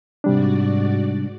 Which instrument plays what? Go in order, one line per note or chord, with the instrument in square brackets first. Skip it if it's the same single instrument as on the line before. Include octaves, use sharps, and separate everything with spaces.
[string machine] G#2 F#4 D5 [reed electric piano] C3 G3 D4